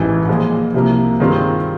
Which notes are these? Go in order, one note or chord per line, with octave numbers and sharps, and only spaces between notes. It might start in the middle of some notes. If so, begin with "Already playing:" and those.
Already playing: A1 G#2 E3
A#2 F3 G#3
C2 C3 F3 A#3
G2 D#3 G#3 C4 F4